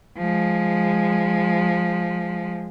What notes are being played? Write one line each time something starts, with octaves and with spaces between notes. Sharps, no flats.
F3 G#3